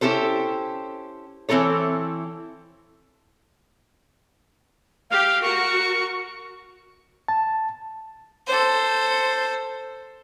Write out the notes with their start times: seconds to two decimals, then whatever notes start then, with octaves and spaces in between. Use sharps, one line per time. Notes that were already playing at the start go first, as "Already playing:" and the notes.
0.01 C#4 E4 G4 A4 C5
1.49 E3 C4 E4 A4 C#5
5.10 G4 F5
5.42 F#4 A#4 C#6
7.28 A5
8.47 A4 C5